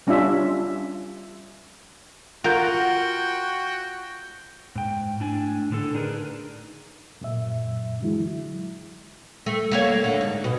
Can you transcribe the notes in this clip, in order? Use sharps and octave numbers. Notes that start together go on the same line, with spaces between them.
G3 C#4 D4 F4 E5
F4 F#4 A#4 F#5 G5 G6
G#2 G5
A2 D4 G#5
A2 D3 A4
D4 D#4 G#4 A#4 B4
F#2 A#2 E5
D3 E3 F#3 G#3 E4
A3
A3 A#3 C#5
D3
G#2
B2